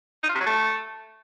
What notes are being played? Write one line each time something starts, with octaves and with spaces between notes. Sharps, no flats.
D#4
F4
C3
F#3
A3